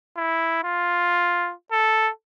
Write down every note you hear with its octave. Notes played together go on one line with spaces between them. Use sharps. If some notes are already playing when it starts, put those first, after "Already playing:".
E4
F4
A4